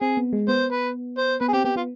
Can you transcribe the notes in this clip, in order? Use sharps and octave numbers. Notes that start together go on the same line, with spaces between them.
C4 G#4
B3
G#3
B3 C5
B4
C5
B3 B4
G#4
C4 G4
B3 G4
B3 F4